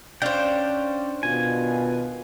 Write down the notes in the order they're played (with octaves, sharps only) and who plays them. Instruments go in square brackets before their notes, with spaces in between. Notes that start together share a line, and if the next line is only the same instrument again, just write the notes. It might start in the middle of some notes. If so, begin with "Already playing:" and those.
[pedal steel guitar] C#4 F5 G5 [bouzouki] D4 C5
[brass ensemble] B2 D#3 F4 [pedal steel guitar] G#5